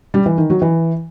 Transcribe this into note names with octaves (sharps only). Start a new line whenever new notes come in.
G3
E3
D#3
F#3
E3